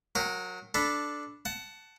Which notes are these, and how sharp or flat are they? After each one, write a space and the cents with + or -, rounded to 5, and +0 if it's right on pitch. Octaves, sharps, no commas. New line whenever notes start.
F#3 -25 A#4 +0 G5 +0
D4 +0 A4 -5 B5 +0
F#5 +15 A5 +0